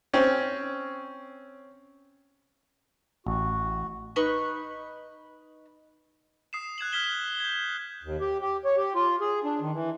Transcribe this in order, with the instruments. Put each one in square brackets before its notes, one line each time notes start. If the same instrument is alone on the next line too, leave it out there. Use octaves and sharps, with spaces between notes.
[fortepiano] C4 C#4
[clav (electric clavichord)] A1 [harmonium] F#4
[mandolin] D#4 B4 C#6
[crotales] D#6 C7 E7
F#6 G#6 E7 F#7
F6 G#6 B6 E7 G7
G6 G#6
[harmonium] D#2
G4
G4
C#5
G4
F4
G#4
D4
D#3
E3